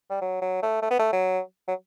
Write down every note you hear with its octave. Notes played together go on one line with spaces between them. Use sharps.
G3
F#3
F#3
A3
A3
B3
A3
F#3
F#3